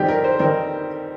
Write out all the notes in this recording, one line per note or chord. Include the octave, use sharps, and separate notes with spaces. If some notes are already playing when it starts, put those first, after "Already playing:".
Already playing: F2 D#3 G3 C4 D#4 G4
A#4
C5
D#3 G3 C4 D#4 A#4